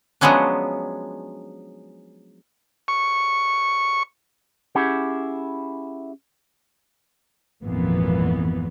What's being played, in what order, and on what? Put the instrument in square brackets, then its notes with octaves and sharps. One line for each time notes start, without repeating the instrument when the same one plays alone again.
[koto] F3 F#3 G#3 B3 C#4 D4
[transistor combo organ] C#6
[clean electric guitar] C#4 E4 G4 G#4 F#5
[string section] G#1 F2 A#2 E3 B3